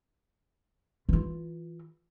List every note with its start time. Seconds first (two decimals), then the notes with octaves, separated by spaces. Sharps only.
1.09 E3 F4